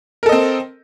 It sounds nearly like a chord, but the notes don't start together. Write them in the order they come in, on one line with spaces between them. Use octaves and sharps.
A#4 A4 D#5 C4